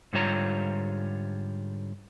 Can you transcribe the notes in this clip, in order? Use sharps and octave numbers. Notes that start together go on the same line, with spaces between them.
G#2 D3 G3 F4 C#5 A#5